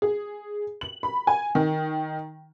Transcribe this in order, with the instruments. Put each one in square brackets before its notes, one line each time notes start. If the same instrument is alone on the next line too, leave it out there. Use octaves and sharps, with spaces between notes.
[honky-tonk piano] G#4
F#7
B5
G#5
D#3